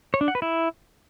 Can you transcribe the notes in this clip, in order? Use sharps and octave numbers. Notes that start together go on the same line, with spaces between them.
C#5
D4
F#5
B4
E4